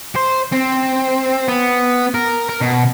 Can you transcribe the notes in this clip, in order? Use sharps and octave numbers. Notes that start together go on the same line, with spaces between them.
C5
C4
B3
A#4
A#4
B2